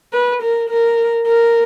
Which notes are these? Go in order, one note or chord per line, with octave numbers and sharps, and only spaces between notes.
B4
A#4
A#4
A#4